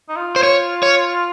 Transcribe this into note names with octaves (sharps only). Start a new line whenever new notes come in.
D#4
F4
C5
C#5
C#5